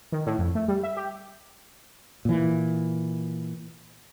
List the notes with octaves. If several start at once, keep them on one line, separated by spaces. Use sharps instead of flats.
D#3
A2
F2
A3
G3
E5
G4
A#2 E3